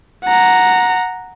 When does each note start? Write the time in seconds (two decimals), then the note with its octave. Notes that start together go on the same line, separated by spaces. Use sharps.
0.24 F#5 A#5